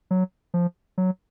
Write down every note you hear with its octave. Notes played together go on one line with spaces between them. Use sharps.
F#3
F3
F#3